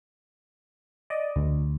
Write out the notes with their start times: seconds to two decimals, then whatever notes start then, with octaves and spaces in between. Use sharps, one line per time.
1.10 D5 D#5
1.36 D2